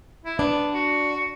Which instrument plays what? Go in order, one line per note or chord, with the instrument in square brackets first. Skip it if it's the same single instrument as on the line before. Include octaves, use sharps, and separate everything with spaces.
[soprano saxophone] E4
[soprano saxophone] B3 [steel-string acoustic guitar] D4
[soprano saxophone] F#4